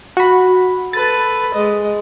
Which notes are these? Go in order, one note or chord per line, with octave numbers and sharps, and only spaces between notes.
F#4 B5
A4 B4 A6
G#3 D#5